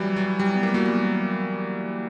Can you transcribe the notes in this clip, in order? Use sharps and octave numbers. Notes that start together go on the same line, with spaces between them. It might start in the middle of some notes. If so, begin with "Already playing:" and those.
Already playing: E3 F#3 G3
F#3
G3
B3
A#3
F#3
G3